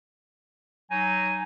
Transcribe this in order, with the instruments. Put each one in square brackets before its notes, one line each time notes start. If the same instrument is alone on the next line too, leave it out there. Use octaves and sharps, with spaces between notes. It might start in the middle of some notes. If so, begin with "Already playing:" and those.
[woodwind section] F#3 D#4 [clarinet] G#5